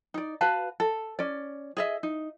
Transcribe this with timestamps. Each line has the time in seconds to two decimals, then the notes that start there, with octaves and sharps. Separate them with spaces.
0.14 D#4 D5
0.41 F#4 B4 F5 A5
0.80 A4
1.19 C#4 D5
1.77 G#4 D#5 E5
2.03 D#4